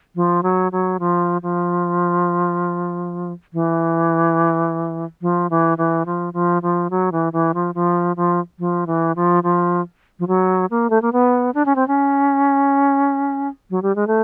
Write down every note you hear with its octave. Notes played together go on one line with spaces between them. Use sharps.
F3
F#3
F#3
F3
F3
E3
F3
E3
E3
F3
F3
F3
F#3
E3
E3
F3
F3
F3
F3
E3
F3
F3
F3
F#3
A#3
A3
A#3
B3
D4
C#4
C4
C#4
F#3
G3
G#3
A3